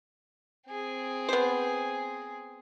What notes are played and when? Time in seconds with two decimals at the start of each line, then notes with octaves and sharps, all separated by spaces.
0.69 C4 G#4
1.29 B3 C5